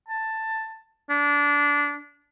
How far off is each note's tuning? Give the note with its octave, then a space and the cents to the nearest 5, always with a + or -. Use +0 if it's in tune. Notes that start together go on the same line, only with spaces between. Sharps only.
A5 +10
D4 -20